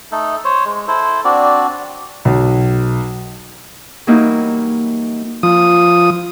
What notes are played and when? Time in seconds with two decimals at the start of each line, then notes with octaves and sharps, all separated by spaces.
0.12 A3 D#4 A4
0.45 C5 C#5
0.65 G#3
0.88 E4 A4 C5
1.25 C4 D4 F#4 D5
2.25 B1
4.07 E3 F#3 G3 A#3 D#4 E4
5.43 F3 D#6